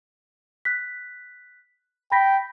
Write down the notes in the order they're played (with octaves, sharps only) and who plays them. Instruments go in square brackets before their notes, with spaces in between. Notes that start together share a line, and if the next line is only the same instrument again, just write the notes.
[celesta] F#6 B6
[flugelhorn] G5 [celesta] B5 A#6 B6